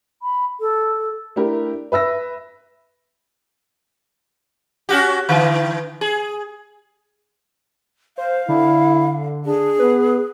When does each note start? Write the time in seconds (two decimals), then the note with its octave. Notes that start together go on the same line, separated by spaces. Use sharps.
0.23 B5
0.60 A4
1.36 A3 D4 E4 G4 A#4
1.92 B4 E5 E6 A#6
4.89 C#4 F#4 G4
5.29 D3 E3
6.01 G#4
8.18 C5 F5
8.49 D3 E4
9.46 D4 G#4
9.79 B3 B4